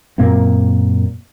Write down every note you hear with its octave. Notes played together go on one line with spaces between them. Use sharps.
F#2 A#2 A#3 C4